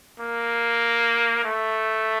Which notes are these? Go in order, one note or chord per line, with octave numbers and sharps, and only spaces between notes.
A#3
A3